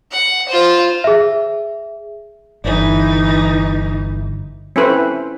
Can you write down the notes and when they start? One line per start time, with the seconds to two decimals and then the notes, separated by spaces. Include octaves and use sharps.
0.12 F#5
0.48 F4 C5
1.04 G#4 E5
2.64 G1 D3 E3 D#4
4.76 C4 C#4 E4 A4 B4 C5